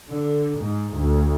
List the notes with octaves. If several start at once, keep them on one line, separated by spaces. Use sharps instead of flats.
D3
G#2
D2